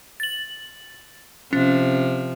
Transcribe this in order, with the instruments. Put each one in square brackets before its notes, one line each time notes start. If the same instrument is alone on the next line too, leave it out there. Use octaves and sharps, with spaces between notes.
[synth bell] A6 F#7
[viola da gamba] C3 F3 [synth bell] C#4